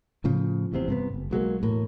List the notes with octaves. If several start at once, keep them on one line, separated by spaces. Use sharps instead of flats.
A2 C#3 F3
F1 E2 C3 C4
G2 C3 B3
F#1
B1 F#3 G#3 A#3
E1 A2 A#3